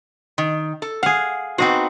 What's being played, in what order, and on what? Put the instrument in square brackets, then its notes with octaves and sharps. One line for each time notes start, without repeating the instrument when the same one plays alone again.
[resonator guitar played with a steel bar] D#3
A4
[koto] G#4 F5 [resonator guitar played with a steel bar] F#5
[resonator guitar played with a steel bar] B3 F#4 [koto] C4 D#4 C5